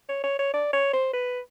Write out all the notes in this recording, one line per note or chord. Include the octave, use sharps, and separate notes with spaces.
C#5
C#5
C#5
D5
C#5
C5
B4